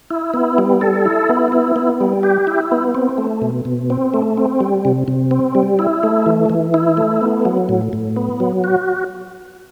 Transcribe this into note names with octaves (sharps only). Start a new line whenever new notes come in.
E4
B3
G3
A4
E4
B3
E4
B3
G3
G4
E4
B3
C4
A3
B2
B2
C4
A3
C4
G3
C3
C3
C4
G3
E4
A3
E3
E3
E4
A3
B3
F#3
A2
A2
B3
F#3
F#4